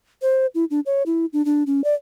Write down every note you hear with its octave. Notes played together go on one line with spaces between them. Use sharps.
C5
E4
D4
C#5
E4
D4
D4
C#4
D5